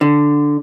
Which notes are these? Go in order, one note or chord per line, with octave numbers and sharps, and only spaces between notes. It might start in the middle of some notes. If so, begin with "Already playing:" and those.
D3